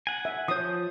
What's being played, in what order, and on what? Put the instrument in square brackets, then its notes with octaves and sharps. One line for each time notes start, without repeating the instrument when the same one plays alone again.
[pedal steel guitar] F#5 G#5
[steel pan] E5
[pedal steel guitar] F3 G6 [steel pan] C#5 D#6